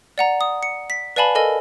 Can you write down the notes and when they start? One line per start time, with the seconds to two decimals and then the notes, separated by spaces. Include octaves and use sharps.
0.18 D5 F#5 A#5
0.41 D#6
0.63 C#7
0.90 B6
1.16 B4 D5 F5 G#5 A5 B5
1.35 A4 A#4 D#5 G#5